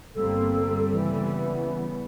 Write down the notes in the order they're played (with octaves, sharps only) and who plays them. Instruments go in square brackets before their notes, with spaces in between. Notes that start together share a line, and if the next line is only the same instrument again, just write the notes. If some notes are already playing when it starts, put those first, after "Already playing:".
[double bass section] G1 A#3 C4 [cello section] G3 [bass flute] A4
[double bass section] C#3 B3 [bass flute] E3